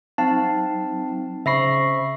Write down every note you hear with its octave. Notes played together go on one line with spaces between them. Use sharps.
F#3 C4 D#4 F5 A5
C#3 C5 E5 B5 C#6 A#6 C7